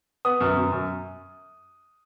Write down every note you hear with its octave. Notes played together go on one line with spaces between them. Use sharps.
B3 D#6
F#2
F#2
F#2